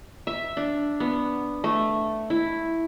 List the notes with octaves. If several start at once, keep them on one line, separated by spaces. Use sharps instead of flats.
E5
D4
B3
A3
E4